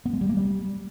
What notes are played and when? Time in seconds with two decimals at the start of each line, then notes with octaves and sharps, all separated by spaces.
0.06 B3
0.13 G#3
0.21 G3
0.29 A#3
0.37 G3